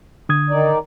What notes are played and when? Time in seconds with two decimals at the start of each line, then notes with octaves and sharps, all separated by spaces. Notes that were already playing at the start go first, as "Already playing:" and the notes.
0.29 D3 D#6 G#6
0.50 D#3 D#4 D5